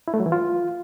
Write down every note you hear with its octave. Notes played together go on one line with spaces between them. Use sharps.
E4
A3
F#3
E3
F4